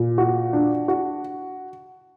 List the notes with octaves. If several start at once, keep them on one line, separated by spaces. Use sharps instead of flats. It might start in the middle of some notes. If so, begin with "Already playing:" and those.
Already playing: A#2
F#4
D4
F#4